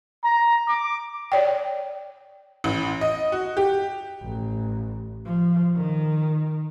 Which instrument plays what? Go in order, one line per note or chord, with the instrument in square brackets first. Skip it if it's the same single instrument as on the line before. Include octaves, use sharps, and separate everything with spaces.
[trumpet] A#5
D6
[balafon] C#5 D5 G5
[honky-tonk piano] A1
D#5
F#4
G4
[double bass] A1
F3
D#3